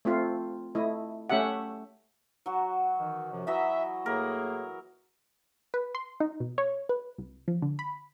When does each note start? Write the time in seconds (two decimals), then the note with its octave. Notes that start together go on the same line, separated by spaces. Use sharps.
0.05 A3 C4 F4
0.75 A3 E4 D#5
1.29 A3 C#4 G4 E5 F#5
2.46 F#3 F#4
3.00 D#3 E3
3.32 F#2 C3 F3
3.47 E3 F#3 D#5 E5
4.06 A2 A#3 G#4 A#4
5.74 B4
5.95 C6
6.20 D#4
6.40 B2
6.58 C#5
6.89 B4
7.18 C2
7.48 F3
7.62 D3
7.79 B5